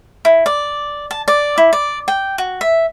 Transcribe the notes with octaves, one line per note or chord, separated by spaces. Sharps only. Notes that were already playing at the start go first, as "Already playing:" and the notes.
E4
D5
A5
D5
E4
D5
G5
F#4
E5